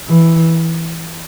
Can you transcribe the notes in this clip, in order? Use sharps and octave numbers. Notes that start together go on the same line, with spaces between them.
E3